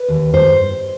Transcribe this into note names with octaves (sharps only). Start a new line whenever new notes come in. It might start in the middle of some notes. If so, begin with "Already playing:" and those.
Already playing: B4
D#2
G2 C5